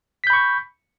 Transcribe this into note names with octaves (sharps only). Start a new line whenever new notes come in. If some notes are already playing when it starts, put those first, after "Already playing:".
B5 C#6 G6 B6